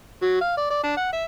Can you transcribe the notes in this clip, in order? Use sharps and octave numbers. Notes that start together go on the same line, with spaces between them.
F#3
F5
D5
D5
D4
F#5
E5